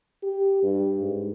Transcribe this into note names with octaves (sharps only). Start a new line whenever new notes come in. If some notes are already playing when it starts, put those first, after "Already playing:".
G4
G2
G#2